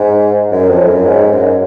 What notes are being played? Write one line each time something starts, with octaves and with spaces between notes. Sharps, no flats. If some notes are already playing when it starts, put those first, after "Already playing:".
Already playing: G#2
F#2
F2
F#2
G#2
F#2